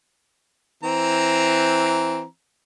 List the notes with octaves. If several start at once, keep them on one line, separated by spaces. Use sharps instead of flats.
E3 C4 A#5